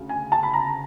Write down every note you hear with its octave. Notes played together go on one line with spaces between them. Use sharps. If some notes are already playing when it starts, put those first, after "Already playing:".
Already playing: D2 C#3
G#5
A5
B5
A#5